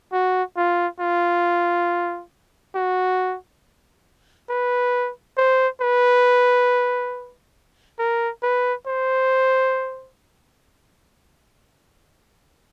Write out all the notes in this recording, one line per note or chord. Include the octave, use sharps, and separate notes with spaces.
F#4
F4
F4
F#4
B4
C5
B4
A#4
B4
C5